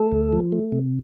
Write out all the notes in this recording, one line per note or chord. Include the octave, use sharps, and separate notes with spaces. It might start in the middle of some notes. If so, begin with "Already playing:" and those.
Already playing: A3 A4
D2
F3
A3
C3